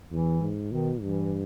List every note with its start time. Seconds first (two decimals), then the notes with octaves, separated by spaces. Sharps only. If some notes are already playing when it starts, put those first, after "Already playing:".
0.11 E2 E3
0.40 G#2
0.71 B2 D#3
1.01 G2 E3